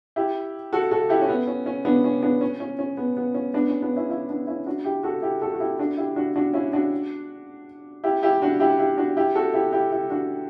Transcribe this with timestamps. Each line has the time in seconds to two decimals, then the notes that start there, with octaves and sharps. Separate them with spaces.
0.16 E4 G4
0.73 F#4 A4
0.91 F#4 A4
1.09 E4 G4
1.22 C#4
1.29 B3
1.47 C#4
1.66 C#4
1.85 B3 D4
2.04 C#4
2.22 B3 D4
2.41 C#4
2.60 C#4
2.79 C#4
2.97 B3
3.17 B3
3.34 C#4
3.54 B3 D4
3.69 C#4
3.82 B3 D4
3.96 C#4 E4
4.10 C#4 E4
4.29 B3 D4
4.47 C#4 E4
4.66 D4 F#4
4.85 E4 G4
5.03 F#4 A4
5.22 E4 G4
5.42 F#4 A4
5.53 F#4
5.60 E4 G4
5.79 D4 F#4
5.98 E4 G4
6.16 D4 F#4
6.36 D4 F#4
6.54 C#4 E4
6.73 D4 F#4
8.04 E4 G4
8.23 E4 G4
8.42 D4 F#4
8.60 E4 G4
8.79 E4 G4
8.98 D4 F#4
9.17 E4 G4
9.35 F#4 A4
9.54 E4 G4
9.73 E4 G4
9.91 E4 G4
10.10 D4 F#4